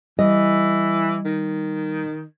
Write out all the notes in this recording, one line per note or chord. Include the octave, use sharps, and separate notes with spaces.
E3 G3 D#5
D#3